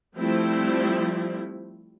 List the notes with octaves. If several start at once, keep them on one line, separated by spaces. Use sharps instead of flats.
F3 G3 A3 C4 E4